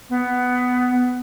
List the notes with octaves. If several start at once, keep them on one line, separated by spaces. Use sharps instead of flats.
B3